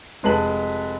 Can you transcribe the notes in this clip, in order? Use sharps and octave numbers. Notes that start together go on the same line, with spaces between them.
F1 G#3 B4 A5 F#7